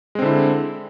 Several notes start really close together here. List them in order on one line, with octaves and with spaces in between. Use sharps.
G#3 C4 D3 E4